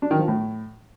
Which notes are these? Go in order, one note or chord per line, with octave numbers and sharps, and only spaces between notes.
D4
D#3
F3
A2